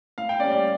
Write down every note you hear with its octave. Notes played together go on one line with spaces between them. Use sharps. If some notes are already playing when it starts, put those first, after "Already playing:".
A2 F5
G5
G3 A#3 C#4 D5
D5